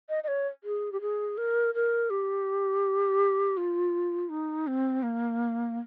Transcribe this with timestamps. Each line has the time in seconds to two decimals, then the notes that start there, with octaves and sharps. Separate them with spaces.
0.09 D#5
0.24 D#5
0.28 C#5
0.64 G#4
0.92 G4
1.01 G#4
1.38 A#4
1.75 A#4
2.10 G4
3.57 F4
4.29 D#4
4.67 C4
5.03 A#3